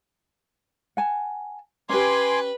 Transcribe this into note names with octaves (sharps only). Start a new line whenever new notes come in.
F#5 G#5 A5
C#4 G4 B4 G#5 C6 D6